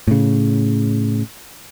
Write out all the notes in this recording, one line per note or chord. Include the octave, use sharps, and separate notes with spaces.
A2 C#3